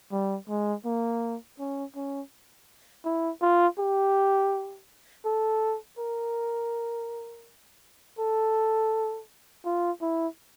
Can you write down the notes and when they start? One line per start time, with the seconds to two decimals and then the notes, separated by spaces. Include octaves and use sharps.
0.12 G3
0.49 G#3
0.85 A#3
1.59 C#4
1.96 C#4
3.05 E4
3.42 F4
3.79 G4
5.26 A4
5.99 A#4
8.19 A4
9.66 F4
10.02 E4